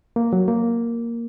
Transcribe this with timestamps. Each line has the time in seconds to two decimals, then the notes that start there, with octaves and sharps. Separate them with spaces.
0.16 A#3
0.33 F#3
0.48 A#3